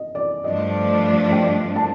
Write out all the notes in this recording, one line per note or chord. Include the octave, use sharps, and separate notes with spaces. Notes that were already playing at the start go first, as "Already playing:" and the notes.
Already playing: D#5
D5
G2 F3 A3 D4 D#5
G5
A5